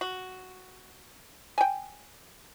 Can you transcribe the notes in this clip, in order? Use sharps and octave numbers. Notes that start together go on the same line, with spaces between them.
F#4
G5 G#5